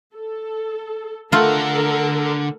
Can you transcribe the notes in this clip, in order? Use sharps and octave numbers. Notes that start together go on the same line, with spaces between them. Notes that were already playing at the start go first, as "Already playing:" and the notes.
A4
D3 A3 F4 A4 A#4 F#5